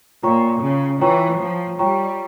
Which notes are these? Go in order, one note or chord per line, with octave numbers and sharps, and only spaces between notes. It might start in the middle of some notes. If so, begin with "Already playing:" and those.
A#2 F4 C#5 G5 A#5 C#6
C#3
E3 F4 C#5 G5 A#5 C#6
F3
G3 F4 C#5 G5 A#5 C#6